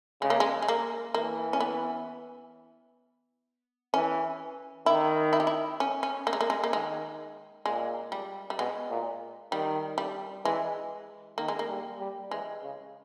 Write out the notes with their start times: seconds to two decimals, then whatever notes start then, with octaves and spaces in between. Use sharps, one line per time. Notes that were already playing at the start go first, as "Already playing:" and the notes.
0.22 C#3 G#3
0.30 A#3
0.40 G#3
0.62 G#3
0.68 A#3
1.14 E3 A#3
1.53 C#4
1.60 B3
3.94 E3 C#4
4.86 D#3 E4
5.33 E4
5.40 G4
5.47 E4
5.80 C#4
6.03 C#4
6.27 A#3
6.33 G#3
6.41 A#3
6.50 G#3
6.64 A#3
6.72 D#3 G#3
7.66 A#2 G#3
8.12 G3
8.50 G3
8.59 B2 G#3
8.90 A#2
9.52 D#3 G3
9.98 G3
10.45 E3 G#3
11.38 D#3 A#3
11.48 G#3
11.59 A#3
11.69 G3
12.00 G3
12.31 E3 G#3
12.62 C#3